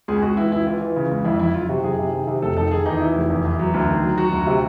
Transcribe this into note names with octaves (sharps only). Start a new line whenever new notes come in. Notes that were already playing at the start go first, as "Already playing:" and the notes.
C#2 G#4
C#2 F#4
E3 E4
C#2 E4
E3 F4
E3
C#3
C#2
F2 E4
F#1 E4
F#1 F4
C3 F#4
F#1 G#4
C3
D#3
C3
F1 A4
D#3 A4
D#3 G#4
E2 D#4
D#3 E4
F1
E2
E2
F#3
D2
D#3
F#3
F#3 F#4
D2
C3